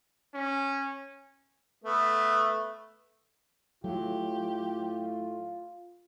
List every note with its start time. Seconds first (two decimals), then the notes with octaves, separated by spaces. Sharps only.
0.34 C#4
1.84 A3 B3
3.84 A2 F#3 F4 G4